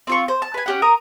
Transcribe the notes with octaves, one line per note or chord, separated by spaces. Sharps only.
C4 F4 C#6
C5
A5
B4 G#5
C#4 G4 F#5
A#4 A#5 D#6